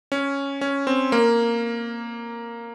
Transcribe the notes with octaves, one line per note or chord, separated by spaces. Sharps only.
C#4
C#4
C4
A#3